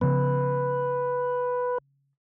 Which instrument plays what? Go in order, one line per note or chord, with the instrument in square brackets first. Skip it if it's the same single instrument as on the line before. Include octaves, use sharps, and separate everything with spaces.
[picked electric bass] C#3 F3 B3 [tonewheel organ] B4